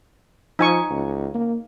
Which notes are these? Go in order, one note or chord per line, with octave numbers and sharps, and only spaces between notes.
F3 D#4 G#5 C#6
C#2
A#3